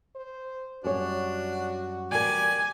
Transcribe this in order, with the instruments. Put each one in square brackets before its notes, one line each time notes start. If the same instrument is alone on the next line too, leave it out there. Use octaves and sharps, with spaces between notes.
[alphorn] C5
[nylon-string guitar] F#2 G3 C#5 [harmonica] D4 [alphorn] F#4
[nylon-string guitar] B2 G3 A#4 [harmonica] G4 D5 [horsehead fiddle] G#5